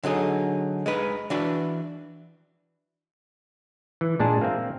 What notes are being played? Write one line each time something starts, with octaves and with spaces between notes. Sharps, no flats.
D3 F#3 D#4 G#4
G#3 D#4 B4
E3 D4 F#4 B4
E3
A#2 G#3 D4 G#4 A5
A#3 C4 E5